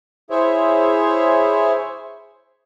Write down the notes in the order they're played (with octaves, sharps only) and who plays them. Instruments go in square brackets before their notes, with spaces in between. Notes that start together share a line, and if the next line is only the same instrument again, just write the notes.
[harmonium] E4 G#4 C5 C#5 E5